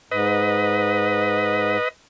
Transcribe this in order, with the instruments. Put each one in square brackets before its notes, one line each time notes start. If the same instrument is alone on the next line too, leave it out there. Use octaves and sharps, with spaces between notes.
[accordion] G#2 [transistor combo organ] B4 D#5